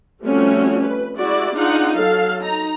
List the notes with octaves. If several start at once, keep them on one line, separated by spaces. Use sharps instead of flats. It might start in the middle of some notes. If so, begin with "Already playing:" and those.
F3 G3 A3 C4 C#4 F#4
B4
G#3 E4 F#4 G4 D5
D4 D#4 F4 G#4 F#5
F#3 A4 F5
D#4 A#5